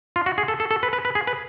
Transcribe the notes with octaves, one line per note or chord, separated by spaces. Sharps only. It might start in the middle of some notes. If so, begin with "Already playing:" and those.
F4
F#4
G#4
A4
A4
A4
B4
B4
B4
G#4
B4